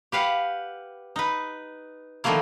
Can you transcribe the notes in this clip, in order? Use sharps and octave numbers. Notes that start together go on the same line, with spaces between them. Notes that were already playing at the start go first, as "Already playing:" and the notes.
G4 B4 F5 F#5
D#4 B4
D3 D#3 F3 A3 A#3 E4